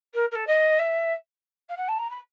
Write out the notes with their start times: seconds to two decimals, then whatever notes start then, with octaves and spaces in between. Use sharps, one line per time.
0.14 A#4
0.31 A#4
0.35 A4
0.47 D#5
0.79 E5
1.69 F5
1.77 F#5
1.88 A5
1.98 A#5
2.10 B5